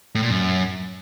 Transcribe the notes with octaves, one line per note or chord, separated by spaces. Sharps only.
A2
A#2
F#2